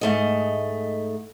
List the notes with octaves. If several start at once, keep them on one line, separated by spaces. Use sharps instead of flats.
G#2 A3 D#5